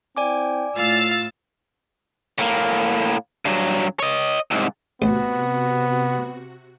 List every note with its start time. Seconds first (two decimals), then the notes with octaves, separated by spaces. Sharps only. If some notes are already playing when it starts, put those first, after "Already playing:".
0.17 C4 E4 D5 G5 G#5 D6
0.76 A2 F4 F5 E6 A6
2.38 A2 A#3
3.45 G2 F#3
3.99 C#5 D#5
4.51 C2 G#2
5.02 A1 C3 B3 F#4